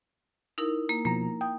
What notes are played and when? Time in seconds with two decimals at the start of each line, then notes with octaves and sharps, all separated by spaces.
0.58 D#4 E4 A#4
0.89 A#3
1.05 B2 F3 A#3 A#5
1.41 G5 D#6